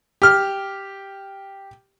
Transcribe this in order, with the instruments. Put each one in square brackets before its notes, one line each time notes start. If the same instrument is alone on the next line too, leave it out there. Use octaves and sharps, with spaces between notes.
[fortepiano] G4 F6